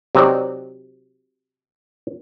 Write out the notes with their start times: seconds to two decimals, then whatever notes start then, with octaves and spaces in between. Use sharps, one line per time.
0.15 C3 F#3 C4 D#4 D5